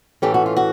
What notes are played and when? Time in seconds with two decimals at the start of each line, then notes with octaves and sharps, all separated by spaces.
0.22 A2 E3 A3 C#4 G4
0.34 F#4
0.46 F4
0.57 F#4